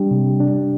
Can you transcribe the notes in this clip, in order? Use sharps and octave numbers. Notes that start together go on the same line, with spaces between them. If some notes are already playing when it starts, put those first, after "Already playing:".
Already playing: G3 D4 G4
C3
D4